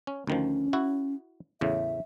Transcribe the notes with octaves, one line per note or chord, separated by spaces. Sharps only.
C#4
D2 D#3 F3 C#4
E4 F#4
E2 A2 C#3 E5